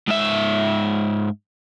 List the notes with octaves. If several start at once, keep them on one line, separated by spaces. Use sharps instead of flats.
G#2 E5